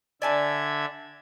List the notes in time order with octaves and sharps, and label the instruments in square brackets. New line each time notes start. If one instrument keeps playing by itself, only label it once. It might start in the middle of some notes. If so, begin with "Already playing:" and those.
[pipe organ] D3 E5 G#6 [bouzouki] D5 G#5 A5